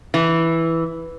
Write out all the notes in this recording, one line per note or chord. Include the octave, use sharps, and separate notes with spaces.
E3